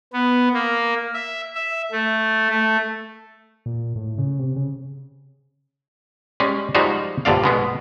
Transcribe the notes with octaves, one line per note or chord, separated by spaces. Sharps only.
B3
A#3
E5
E5
A3
A3
A#2
A#2
A2
C#3
C3
C#3
G3 G#3 C#4
F3 G3 G#3 D#4 F4 F#4
A#1 G2 D3 D5 F5
B2 G#3 B3